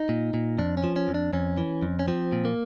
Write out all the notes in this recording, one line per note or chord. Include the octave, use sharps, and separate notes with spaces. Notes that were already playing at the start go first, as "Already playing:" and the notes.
Already playing: D#4
A#2
A#2
F2 D4
C#4
F3
C#4
F2
D4
F2 C#4
E3
F2
C#4
F3 C4
A#2
A#3